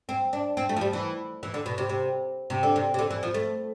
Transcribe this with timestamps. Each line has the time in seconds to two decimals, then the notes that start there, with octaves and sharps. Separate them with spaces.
0.09 C4
0.33 D4
0.57 C4
0.69 A3
0.76 F3
0.81 G3
0.93 E3
1.43 E3
1.54 D3
1.66 B2
1.78 C3
1.89 C3
2.50 C3
2.63 D3
2.76 C3
2.94 C3
2.99 D3
3.11 E3
3.23 F3
3.34 A3